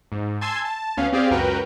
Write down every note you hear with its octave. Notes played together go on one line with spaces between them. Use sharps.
G#2
G#5 A5 C6 E6 G#6
A5
D2 B3 C#4 F5
C4 G4 G#4 D5 F5
C#2 F#2 F#4 A#4 B4 G5